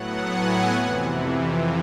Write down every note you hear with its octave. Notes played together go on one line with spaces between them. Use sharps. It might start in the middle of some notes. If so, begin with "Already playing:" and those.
Already playing: A2 F#3 B3 F#5
G#5
F2 C3 E3